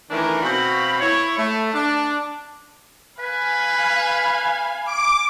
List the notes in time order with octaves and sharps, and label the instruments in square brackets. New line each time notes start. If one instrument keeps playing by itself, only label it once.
[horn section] D#3 E3 A3 C#4 D4 A#4
B2 C4 F#4 F5 B5
E4 C#5
A3
D4
[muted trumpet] B4 [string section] F5 G#5 B5
[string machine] D6